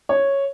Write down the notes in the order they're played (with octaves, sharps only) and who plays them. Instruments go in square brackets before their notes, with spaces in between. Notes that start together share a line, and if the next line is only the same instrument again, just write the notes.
[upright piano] C#5